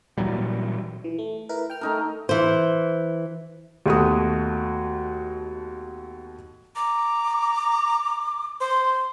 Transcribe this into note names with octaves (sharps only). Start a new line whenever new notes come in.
A#2 E3 F#3 G3
E3
A3
E4 A#4 B4
G5 F6
A3 D#4 A#4
E3 C5
D#2 B2 A3 F#4 D#6
A#5 D6
C5 C6